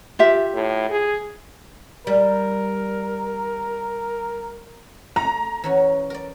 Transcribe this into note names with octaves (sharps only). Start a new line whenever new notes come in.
F4 G4 E5
A2
G#4
G3 A#4
A3 A#5
E3 C#4 F#4
A#4 D5